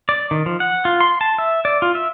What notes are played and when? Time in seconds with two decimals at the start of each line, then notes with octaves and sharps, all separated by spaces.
0.09 D5
0.31 D#3
0.46 F3
0.60 F#5
0.85 F4
1.00 C6
1.21 A5
1.38 E5
1.65 D5
1.82 F4
1.95 E5